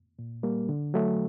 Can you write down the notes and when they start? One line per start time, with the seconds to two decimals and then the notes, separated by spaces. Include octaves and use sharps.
0.19 A#2
0.43 G3 A#3
0.69 D3
0.94 F#3 A3